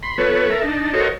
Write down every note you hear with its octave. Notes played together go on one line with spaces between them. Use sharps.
B5 C6
F3 B3 A4 B4 C#5
A4 A#4 E5
D4 D#4 A5
F#4 A4 A#4 C5 C#5 D#5